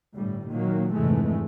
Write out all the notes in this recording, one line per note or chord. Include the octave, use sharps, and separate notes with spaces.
G1 A2 G3
A#2 D#3 F#3 A#3
F1 D2 G#2 E3 G#3 A3